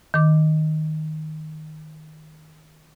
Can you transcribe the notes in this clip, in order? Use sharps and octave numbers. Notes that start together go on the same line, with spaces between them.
D#3 D6